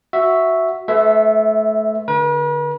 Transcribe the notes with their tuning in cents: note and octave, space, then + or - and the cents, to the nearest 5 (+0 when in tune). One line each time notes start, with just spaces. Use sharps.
F#4 +0 E5 +0
A3 -30 B4 +25 E5 +0
D3 +0 B4 -45